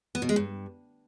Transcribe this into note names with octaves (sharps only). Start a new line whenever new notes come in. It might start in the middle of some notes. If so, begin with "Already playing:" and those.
B3
B2
G#3
G2